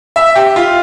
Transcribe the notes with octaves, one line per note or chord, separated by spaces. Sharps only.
E5
G4
F4